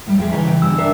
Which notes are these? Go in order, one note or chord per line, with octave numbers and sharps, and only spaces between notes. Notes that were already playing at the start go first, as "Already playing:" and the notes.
A2 G3
F2 G#4 E5 G5
C#3 E3 D#4 E4 G#5
G5
G2 D3 E6
D4 A#4 E5